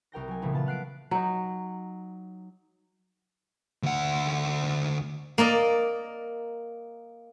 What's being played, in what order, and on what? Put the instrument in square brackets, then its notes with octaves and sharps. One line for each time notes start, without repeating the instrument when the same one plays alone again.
[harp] C2 A#4 G5 A#6
F#3 G#5
A#2 C#3 E3 F3 A3 A#3
B3 F4 A5
F5 F#5 F#6 B6 C7 D7
[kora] F#3 D#4
[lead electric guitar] D2 F#5
[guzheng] A#3 A#4 D5 D#5